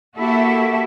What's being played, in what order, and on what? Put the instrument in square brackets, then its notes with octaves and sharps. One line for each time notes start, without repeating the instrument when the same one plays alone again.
[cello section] A#3 E4 F#4 G4 A4 E5